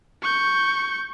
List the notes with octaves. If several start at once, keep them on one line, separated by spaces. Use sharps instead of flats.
C#6 G6